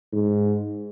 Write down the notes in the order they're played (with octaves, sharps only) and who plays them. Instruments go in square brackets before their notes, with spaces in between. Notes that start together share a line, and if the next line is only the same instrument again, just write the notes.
[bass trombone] G#2